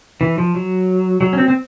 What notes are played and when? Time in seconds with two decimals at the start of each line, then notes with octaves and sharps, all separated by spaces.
0.21 E3
0.38 F3
0.55 F#3
1.21 F#3
1.33 C#4
1.38 C4
1.48 C4